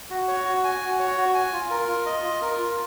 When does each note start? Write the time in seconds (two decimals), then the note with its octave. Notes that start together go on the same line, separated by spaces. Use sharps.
0.10 F#4
0.28 C#5
0.45 F#4
0.64 G#5
0.81 F#4
0.99 C#5
1.18 F#4
1.34 G#5
1.53 F4
1.71 A#4
1.88 F4
2.06 D#5
2.24 F4
2.42 A#4
2.59 F4